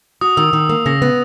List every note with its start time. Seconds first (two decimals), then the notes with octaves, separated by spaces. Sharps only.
0.21 F#4 D#6
0.37 D#3 E6
0.53 D#3
0.69 A#3
0.86 C#3 A#6
1.02 B3